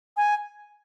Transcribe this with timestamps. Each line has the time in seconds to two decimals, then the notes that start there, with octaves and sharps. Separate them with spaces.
0.17 G#5